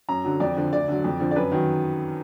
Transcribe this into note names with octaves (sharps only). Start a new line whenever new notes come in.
F#2 A#5
D3 F#3
F2 D5
D3 F3
D2 D5
D3 F#3
F2
D3 F3
D5
F#2 B4
D#3 F#3